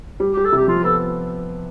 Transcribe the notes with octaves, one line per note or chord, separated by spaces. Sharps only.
G3
G4
G3
A4
C3 G4
F3 F4
B3 A4